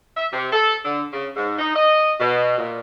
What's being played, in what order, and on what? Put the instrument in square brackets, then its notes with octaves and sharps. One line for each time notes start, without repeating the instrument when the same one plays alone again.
[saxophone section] E5
C3
A4
D3
C#3
G#2
D#4
D#5
B2
A#2